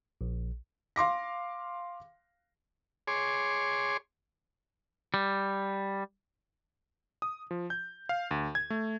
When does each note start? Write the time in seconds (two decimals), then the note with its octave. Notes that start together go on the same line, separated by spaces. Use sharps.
0.21 A#1
0.96 F5 C6 D6 A#6
3.08 G#4 C#5 C6 D6
5.14 G3
7.22 D#6
7.51 F3
7.70 G6
8.09 F5
8.31 D2
8.55 G#6
8.70 A3